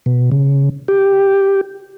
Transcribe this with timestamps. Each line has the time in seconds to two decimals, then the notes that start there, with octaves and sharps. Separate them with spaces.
0.06 B2
0.32 C#3
0.88 G4